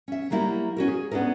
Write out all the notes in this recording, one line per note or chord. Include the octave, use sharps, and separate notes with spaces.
C#4 E5
F#3 G3 A#3 E4 F#4 G4
C#4 F#4 A#4
G#4
B3 C#4 D4 E4 A#4